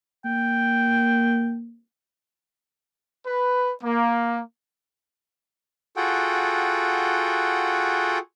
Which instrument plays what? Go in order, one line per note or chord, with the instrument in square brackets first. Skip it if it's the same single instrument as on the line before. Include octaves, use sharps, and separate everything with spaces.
[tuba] A#3 [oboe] G5
[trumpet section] B4
A#3
[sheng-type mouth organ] F4 F#4 G#4 A4 F#5 G5